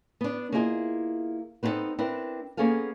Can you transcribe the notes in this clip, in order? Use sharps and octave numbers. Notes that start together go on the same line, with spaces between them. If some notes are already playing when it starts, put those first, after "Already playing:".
B3 D4
A#3 E4 F4 G#4 D#5
B3 C4 D#4 F4 A4
C4 D4 E4 A#4 B4
A#3 B3 C#4 G#4 A4 F5